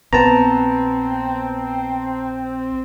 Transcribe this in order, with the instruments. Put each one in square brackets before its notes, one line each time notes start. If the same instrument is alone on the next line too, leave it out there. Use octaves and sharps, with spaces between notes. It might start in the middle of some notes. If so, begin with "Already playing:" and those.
[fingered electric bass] A#1 [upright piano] B3 [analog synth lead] C4 [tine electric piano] A5 A#5